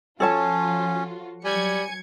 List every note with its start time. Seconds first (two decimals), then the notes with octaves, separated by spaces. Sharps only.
0.20 F3 C#4 F4 F#4 A4 C#5 A5
1.45 F#3 G3 G#5 G#6 C#7